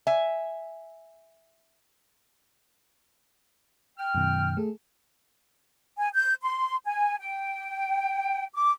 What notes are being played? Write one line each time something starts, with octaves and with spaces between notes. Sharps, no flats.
E5 G#5
G5 F6
F#2 B2 D#3
A3 G#4 A4
G#5
G6
C6
G#5
G5
D6